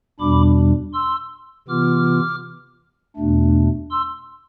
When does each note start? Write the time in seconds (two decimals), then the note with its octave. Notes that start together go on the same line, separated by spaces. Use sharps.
0.20 E2 B2 G3 D4 B5 D6
0.94 C6 E6
1.68 C3 E3 B3 F4 D6 F6
3.16 E2 B2 A3 D4
3.91 C6 E6